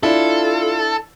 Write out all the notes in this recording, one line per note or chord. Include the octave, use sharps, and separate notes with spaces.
D4 E4 F4 A4